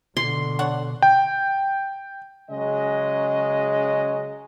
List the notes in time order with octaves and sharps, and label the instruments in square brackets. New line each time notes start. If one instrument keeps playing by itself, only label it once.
[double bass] B2 D3 [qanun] C6
[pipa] D4 C#5 F#5
[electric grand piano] G5
[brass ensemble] C#3 F#3 G#3 D#5